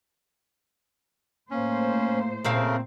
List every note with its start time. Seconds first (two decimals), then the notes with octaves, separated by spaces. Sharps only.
1.51 A2 A#3 C#4 C5
2.44 A#2 C#3 A3 C4 A#4 F5